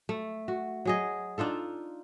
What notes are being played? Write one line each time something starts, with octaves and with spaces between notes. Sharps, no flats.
A3
F#4
F#3 G#4 D#5
D4 D#4 F4 A4